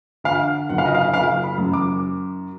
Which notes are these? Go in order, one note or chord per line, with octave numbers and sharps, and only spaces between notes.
D3 F5
F#1 F#5
F5
D#5
F5
F#1 F5
B5
F#2
D6